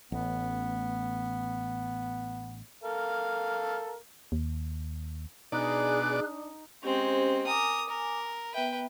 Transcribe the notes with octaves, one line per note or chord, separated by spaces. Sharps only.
A1 B3
A4 A#4 F5
D#2
B2 D4 D#4 G#4 D5 F#6
G#3 C4 C#4 G4 C5
A#4 G#5 D6 D#6
A#4
B3 B4 E5 G5